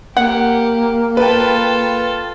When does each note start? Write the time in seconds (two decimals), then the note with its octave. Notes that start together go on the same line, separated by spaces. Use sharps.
0.17 A#3 G4 F#5
1.17 F4 A4 B4 G5